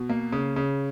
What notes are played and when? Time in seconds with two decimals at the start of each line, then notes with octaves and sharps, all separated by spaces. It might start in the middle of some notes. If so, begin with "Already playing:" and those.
Already playing: B2
0.10 A#3
0.32 C#3
0.56 C#3